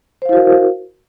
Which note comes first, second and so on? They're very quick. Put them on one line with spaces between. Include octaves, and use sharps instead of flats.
C5 F5 E4 F#4 A#4